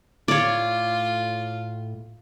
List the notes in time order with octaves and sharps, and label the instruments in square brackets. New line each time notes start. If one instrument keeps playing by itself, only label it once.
[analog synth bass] A2 [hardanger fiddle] F4 [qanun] C#5 D5